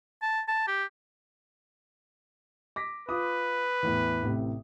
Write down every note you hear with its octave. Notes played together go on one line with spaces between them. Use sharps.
A5
A5
G4
D6 A#6 B6
F4 B4 D6 D#6
E2 A2 E3
A1 A2 C3